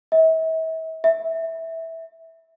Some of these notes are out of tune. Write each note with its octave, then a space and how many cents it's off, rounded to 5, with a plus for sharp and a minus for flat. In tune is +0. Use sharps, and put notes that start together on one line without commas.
E5 -40
E5 -10